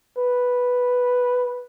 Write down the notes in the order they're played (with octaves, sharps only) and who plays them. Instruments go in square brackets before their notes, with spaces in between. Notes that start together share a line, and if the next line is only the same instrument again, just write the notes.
[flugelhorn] B4